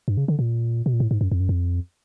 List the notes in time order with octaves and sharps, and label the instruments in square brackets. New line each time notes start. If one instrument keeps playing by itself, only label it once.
[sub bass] G2
C#3
D3
A#2
B2
A#2
A2
G#2
F#2
F2
F#2
F2